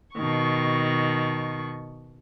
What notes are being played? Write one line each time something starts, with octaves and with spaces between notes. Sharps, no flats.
B2 D#3 C#6